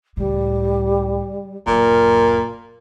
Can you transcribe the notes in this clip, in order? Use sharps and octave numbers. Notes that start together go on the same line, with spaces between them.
C#2 A2 G3
D1 F#2 A#2 A#4